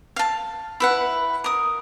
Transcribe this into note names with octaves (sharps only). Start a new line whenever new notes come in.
F5 A5
E4 B4 F#5
A#4 D#6